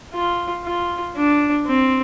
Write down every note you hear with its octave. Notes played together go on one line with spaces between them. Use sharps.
F4
F4
D4
C4